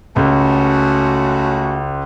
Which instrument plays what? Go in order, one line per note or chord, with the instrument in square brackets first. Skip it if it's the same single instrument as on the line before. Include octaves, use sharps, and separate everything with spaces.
[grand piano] C#2 [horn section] A3 C#4 F#4